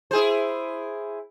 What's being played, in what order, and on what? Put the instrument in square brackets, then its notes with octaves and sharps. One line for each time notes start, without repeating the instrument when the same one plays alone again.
[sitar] E4 G#4 C5